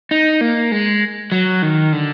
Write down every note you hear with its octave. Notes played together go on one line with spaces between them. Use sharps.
D#4
A#3
G#3
F#3
D#3
D3